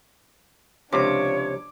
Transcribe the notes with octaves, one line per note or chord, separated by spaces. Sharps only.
C#2 C3 F3 D4 C#5 D6